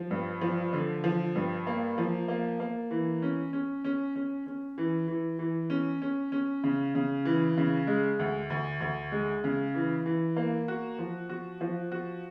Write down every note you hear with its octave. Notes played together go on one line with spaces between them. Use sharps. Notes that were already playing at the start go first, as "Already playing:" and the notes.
Already playing: F3
G2
F3
D3
F3
G2
A#3
F3
A#3
A#3
E3
C#4
C#4
C#4
C#4
C#4
E3
E3
E3
C#4
C#4
C#4
C#3
C#3
E3
C#3
G#3
D2
D2
D2
G#3
C#3
E3
E3
A#3
F#4
F3
F#4
F3
F#4